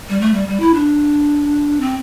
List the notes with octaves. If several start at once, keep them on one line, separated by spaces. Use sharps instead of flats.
G3
A3
G3
G3
E4
D4
C4